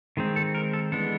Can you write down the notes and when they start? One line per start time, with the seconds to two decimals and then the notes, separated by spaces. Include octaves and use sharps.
0.17 D#3 G#3 C4
0.36 A4
0.55 A#4
0.73 A4
0.92 E3 G#3 B3 D4 A4